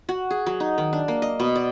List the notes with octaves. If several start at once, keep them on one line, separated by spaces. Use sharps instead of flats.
F#4
G#4
F#3
D#4
D#3
D4
A#3
D#5
B2
D5